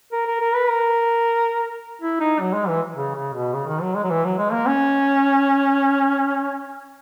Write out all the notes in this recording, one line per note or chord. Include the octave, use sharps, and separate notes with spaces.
A#4
A#4
A#4
B4
A#4
E4
D#4
F#3
G#3
E3
C#3
C#3
B2
C#3
D#3
F#3
G#3
F#3
E3
F#3
G#3
A#3
C#4